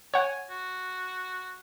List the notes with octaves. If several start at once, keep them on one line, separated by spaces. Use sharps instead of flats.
C#5 F#5 G#5
F#4